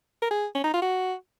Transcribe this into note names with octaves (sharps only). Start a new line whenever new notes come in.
A#4
G#4
C#4
D#4
F4
F#4